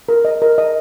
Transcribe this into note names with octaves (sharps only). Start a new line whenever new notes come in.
A#4
D#5
A#4
D#5